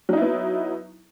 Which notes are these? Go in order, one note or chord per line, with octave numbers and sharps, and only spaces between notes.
F#3 B3 D#4 E4